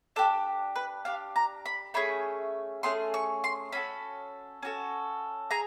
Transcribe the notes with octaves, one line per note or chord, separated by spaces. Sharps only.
D4 G4 A4
B4
D4 G4 F5
A#5
B5
A3 C#4 G#4 B5
A3 C#4 G#4 C6
C#6
C6
C#4 F#4 A4 B5
C#4 F#4 A4
G#4 A#5